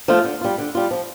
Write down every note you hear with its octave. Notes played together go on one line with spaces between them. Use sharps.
F3 A3 F4
D3
G3 F4
D3
G3 F4
F3